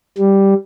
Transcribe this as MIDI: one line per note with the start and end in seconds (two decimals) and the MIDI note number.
0.18 0.54 55